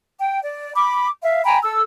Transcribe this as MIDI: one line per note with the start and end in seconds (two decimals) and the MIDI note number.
0.18 0.40 79
0.42 0.72 74
0.76 1.08 83
0.76 1.08 86
1.23 1.42 76
1.23 1.42 77
1.45 1.59 79
1.45 1.59 80
1.45 1.59 82
1.45 1.59 83
1.62 1.81 69
1.62 1.81 88